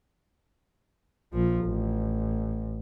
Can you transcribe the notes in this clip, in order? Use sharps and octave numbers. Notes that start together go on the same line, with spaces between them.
A#1 F3
A1